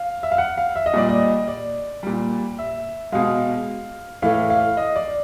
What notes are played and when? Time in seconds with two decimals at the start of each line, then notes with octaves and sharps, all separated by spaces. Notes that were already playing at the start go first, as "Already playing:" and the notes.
Already playing: F5
0.23 E5
0.32 F5
0.38 F#5
0.58 F5
0.76 E5
0.86 D#5
0.94 A#2 G3 D5
1.09 D#5
1.48 D5
2.03 A#2 G3
2.59 E5
3.12 B2 G#3 F5
4.22 A2 E3 A3 F5
4.50 F5
4.77 D#5
4.96 D5